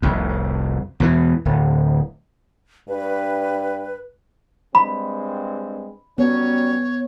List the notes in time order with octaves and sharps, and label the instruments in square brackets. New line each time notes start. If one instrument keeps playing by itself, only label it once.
[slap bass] F1 C2 F2
E2 B2 E3
D1
[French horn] G2 [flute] B4
[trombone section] G2 G#3 C4 [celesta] B5
[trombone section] F#3 G3 C#4 [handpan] B3 [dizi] C#5